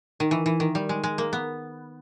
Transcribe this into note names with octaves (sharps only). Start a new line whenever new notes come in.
D#3
E3
E3
D#3
G3
G#3
G#3
A#3
B3